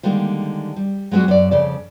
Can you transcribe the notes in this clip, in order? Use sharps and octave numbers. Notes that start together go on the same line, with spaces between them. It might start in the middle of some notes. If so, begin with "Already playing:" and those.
D3 D#3 G3 G#3 A#3
G3
F#3 G#3 B3 D4 F#4
F#2 D5
F2 C#3 D5